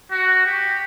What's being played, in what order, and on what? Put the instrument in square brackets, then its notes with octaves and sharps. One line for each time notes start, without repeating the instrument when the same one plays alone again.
[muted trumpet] F#4
G4